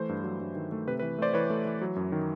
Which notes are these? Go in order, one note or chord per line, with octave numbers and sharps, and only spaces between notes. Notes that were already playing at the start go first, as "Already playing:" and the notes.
Already playing: E3 A3 C5
G2
F#3
G2
D#3
A3
C3 B4
B4
E3
A3 C5 D5
E3 B4 C#5
A3
E3
F#3
F#2
D#3